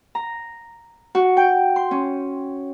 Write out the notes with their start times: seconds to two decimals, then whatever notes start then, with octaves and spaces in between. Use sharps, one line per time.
0.15 A#5
1.15 F#4
1.37 G5
1.76 C6
1.91 C#4